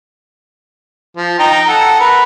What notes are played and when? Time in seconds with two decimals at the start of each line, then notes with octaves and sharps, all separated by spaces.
1.17 F3
1.39 D#4 G5 A#5
1.68 A4 F#5
2.00 A#4 B4